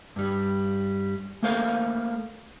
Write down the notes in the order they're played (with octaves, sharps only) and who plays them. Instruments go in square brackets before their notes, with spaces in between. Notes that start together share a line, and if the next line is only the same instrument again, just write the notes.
[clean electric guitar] G2 G3
A3 A#3 A4 A#4 C5 F5